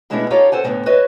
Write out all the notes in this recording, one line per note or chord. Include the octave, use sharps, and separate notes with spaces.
B2 G#3 A3 B3 D4 E4
D#4 F4 G4 A4 C#5 F5
A4 C5 F#5 G#5
D2 A2 D3 E3 F#3 B3
F#4 B4 C#5 D#5 E5